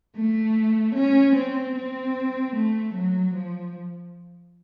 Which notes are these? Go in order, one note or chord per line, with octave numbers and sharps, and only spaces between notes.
A3
C#4
C4
C4
A3
F#3
F3